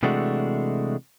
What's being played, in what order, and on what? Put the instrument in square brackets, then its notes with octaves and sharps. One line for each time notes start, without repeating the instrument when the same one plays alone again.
[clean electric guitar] C3 E3 G#3 A3 D4 F#4